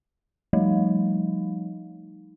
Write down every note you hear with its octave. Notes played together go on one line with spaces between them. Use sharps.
F3 G3 A3 D#4